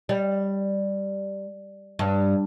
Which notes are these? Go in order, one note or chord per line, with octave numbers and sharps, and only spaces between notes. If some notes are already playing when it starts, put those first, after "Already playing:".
G3
G2